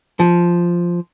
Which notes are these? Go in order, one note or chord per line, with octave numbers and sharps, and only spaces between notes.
F3